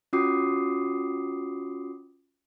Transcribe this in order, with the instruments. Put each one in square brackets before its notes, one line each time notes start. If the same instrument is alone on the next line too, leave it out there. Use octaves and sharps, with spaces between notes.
[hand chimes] C#4 F4 F#4 D6 D#6 C7